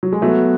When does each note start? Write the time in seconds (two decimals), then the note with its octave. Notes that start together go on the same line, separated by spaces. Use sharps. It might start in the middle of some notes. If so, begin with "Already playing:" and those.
0.03 F#3
0.13 G#3
0.22 F#3 A3 B3